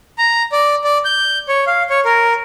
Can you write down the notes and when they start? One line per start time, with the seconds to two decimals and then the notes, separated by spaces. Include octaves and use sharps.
0.18 A#5
0.52 D5
0.84 D5
1.05 G6
1.48 C#5
1.67 F5
1.90 C#5
2.05 A#4